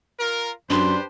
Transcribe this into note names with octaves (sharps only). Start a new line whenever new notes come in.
F4 A#4
F#2 D4 G4 B4 C5 C6